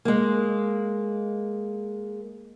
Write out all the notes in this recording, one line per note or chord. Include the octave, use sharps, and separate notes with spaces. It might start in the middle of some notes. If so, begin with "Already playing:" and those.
G#3 A#3